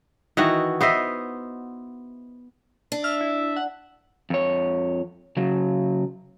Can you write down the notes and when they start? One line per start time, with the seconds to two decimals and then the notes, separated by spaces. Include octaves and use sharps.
0.37 D#3 E3 F#4 D#5
0.81 B3 C5 D#5 E5
2.92 D4
3.04 E5 F6
3.21 E4
3.56 F#5
4.30 F2 C#5
5.37 C#3 F#3